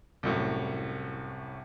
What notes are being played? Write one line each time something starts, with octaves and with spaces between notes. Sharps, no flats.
C2 F#2 A2